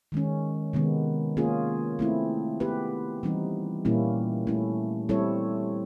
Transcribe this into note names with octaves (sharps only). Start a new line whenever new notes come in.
D#3 G#3 C#4
C3 D#3 G#3 B3
A#3 C#4 F4 G#4
A3 C4 E4
B3 E4 G4 B4
E3 G3 C4 D#4
A#2 G3 A#3 C#4 E4
A3 C#4 E4
G3 C4 E4 A4 C#5